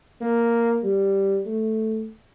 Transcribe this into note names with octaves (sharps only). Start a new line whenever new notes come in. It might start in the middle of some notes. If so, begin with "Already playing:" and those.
A#3
G3
A3